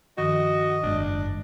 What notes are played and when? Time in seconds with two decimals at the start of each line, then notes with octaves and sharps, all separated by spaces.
0.18 G2 D#3 F3 F#4 D#5
0.83 F#1 G#2 G#3 D4